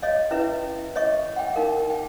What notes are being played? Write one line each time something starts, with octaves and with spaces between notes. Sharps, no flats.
C#5 D#5 F5
C#4 E4 B4 E5
C#5 D#5 E5 C#6
F#5 G5
D#4 A#4 F5
G5